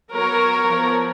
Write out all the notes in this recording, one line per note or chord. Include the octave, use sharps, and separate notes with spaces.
F#3 B3 A#4 C#5
F3 B3